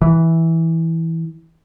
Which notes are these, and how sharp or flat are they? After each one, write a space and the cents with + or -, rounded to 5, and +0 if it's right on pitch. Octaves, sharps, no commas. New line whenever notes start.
E3 -10